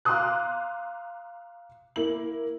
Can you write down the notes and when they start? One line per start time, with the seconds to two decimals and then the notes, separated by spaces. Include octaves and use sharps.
0.05 F5 A#5 C6 D6 D#6 F#6
1.96 A#3 E4 F#7